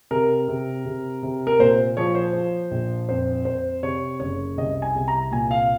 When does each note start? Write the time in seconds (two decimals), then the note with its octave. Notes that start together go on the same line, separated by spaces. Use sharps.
0.11 C3 A#4
0.48 C3
0.85 C3
1.23 C3
1.47 A#4
1.59 A#2 C5
1.97 F3 C#5
2.15 C5
2.33 F3
2.71 A#1
3.09 F2 C5
3.45 F2 C5
3.83 C3 C#5
4.20 F#1 C#5
4.57 C2 D#5
4.82 G#5
4.95 C2
5.08 A#5
5.31 A#2 G#5
5.51 F5